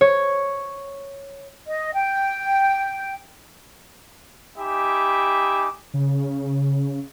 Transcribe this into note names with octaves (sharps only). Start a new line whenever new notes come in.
C#5
D#5
G5
D#4 G4 E5 G#5 B5 D6
C#3